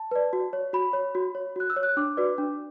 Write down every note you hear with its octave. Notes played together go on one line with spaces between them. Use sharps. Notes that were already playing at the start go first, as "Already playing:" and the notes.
Already playing: A5
B4 D5
F#4
C#5
F#4 B5
C#5
F#4
C#5
F#4 F#6
E6
C#5
F#6
D4 D6
F#4 B4 D5
D4